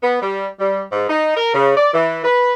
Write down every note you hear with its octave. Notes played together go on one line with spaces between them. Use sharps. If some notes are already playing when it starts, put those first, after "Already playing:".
B3
G3
G3
G#2
D#4
A#4
C#3
D5
E3
B4